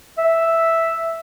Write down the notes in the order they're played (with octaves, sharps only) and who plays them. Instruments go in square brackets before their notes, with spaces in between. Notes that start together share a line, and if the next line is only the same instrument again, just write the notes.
[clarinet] E5